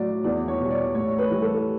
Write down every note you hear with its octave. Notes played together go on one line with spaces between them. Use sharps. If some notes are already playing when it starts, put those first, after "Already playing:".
Already playing: A2 F#3 D5
E2 D5
C#5
B2 G3
D5
A2 C#5
B4
E3 G3
A4